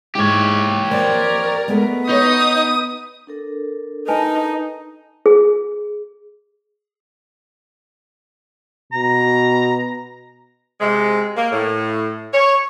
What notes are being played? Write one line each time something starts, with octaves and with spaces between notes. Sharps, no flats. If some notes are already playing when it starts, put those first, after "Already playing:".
G#2 G#3 E4 G4 C#5
F2 A#3 A#4 C5 D5
G#3 A3 B3
D#4 B4 C#5 D#6
D4 A4 A#4
D#4 B4 D#5 G#5 A5
G#4
B2 A#5
C3 G#3
A#3
A2
C#5